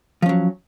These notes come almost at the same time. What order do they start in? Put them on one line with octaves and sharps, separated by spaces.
F3 C#4 F#3